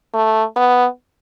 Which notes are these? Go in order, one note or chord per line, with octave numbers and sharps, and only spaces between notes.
A3
B3